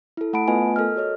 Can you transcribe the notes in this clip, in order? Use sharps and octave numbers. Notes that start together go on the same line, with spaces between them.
E4 A4
A3 F#5 A5 B5 D7
A3 B3 F4 B4 D#5 G#5
A4 A#4 D#5 F6
F#4 C#5 D#5